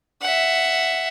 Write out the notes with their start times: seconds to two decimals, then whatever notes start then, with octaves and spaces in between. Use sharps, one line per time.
0.22 E5 F#5